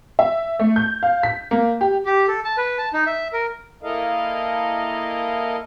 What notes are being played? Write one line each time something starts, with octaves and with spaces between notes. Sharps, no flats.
E5
A3
G6
F5
B6
A#3
G4
G4
A4
A5
B4
A5
D#4
E5
A#4
A#3 E4 A4 A#4 D#5 F5